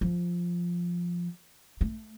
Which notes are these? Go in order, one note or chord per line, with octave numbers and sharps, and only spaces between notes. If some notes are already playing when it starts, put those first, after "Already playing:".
F3
A3